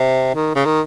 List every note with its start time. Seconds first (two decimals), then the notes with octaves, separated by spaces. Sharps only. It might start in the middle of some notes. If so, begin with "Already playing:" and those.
Already playing: C3
0.35 D#3
0.55 C#3
0.65 D#3